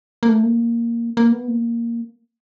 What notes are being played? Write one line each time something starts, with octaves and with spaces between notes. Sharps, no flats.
A#3
A3
A#3
A#3
B3
A#3